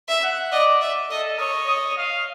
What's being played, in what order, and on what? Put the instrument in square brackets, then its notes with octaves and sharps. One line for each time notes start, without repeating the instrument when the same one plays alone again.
[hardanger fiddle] E5
[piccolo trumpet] F#5
[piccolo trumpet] D5 [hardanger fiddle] D#5
[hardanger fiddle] E5
[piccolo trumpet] A4 [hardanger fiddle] D#5
[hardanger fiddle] C#5 [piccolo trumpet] D#5
[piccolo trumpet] D#5
F5